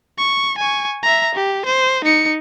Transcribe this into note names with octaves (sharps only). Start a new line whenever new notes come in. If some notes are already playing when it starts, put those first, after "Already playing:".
C#6
G#5 C#6
E5 A#5
G4
C5
D#4 C#7